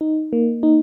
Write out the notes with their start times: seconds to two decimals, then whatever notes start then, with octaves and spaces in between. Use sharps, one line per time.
0.01 D#4
0.33 A#3
0.63 D#4